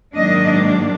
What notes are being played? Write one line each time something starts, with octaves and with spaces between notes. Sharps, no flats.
G#2 D#3 F#3 A#3 D4 D#5